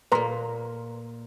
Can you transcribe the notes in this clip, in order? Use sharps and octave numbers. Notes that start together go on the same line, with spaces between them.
A#2 A#3 B4 A#5 C6